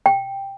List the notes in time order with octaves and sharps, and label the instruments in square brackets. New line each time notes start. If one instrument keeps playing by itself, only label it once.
[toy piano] G5